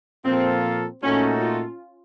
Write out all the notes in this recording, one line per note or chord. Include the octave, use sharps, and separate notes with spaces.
A#2 F3 A#3 C4 F4 A4
A#2 A3 C#4 D#4 F#4 A4
F4